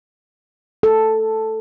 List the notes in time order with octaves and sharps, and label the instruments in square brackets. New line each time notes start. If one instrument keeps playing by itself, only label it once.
[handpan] A4